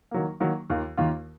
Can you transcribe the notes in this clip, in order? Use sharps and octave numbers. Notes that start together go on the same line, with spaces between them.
D#3 F#3 A#3
D#3 F#3 A#3
D#2 D#3 A#3 F4
D#2 D#3 A#3 F4